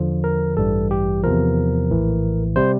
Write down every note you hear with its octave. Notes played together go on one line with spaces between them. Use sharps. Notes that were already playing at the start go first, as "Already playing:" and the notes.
Already playing: E2 D3 F3
A#4
A1 G2 E3 G3 A4
G4
E2 C3 F3 A#4
A#1 A2 E3
C3 G3 C5